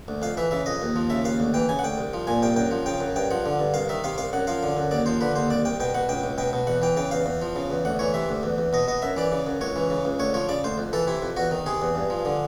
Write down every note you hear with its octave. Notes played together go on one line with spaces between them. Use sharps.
D2
F2 F5
E3 E5
C#3 E5
F2 D#5
D#2
F3
C#3 E5
D#2 F5
D2
E3 G5
C#3 G#5
F#5
D2 G5
C2
F3
A#2 G#5
C2 G5
F#2 G5
F3
C#3 G5
F#2
G2 G5
F3 F#5
D3
G2
C2 F5
D#3 E5
C3 F5
C2 F5
F#2 F#5
F3 F5
D3
F#2
D#2 D5
F3 C5
D3 B4
D#2 C5
C2 D5
C2 G5
B2 G5
B2 F#5
C#2 G5
C#2
B2 G5
B2
E2 F#5
E3 G5
C#3 G5
E2 F5
E2
F3
C#3
E2
D2 F#5
E3 C#5
C3 E5
D2
E2
E2
B2 D#5
B2 D#5
F#2 E5
E3 D5
C#3
F#2
C#2 C#5
E3
C#3
C#2
D2 C#5
F3 C#5
C#3 D5
D2 C5
F2
E3 A4
C3 E4
F2
E2 F#4
D#3
C3 G#4
E2
G2
F3
D3